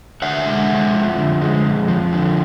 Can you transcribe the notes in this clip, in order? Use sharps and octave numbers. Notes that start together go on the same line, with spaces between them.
D3 E5 F#5
G#3
F2
F3
D3
G#3
F2
F3
D3